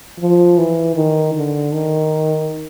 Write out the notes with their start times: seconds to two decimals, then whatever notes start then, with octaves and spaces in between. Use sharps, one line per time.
0.20 F3
0.58 E3
0.96 D#3
1.35 D3
1.73 D#3